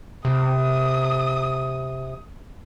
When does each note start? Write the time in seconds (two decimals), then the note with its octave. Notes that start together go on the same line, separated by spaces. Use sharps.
0.25 C3 D#6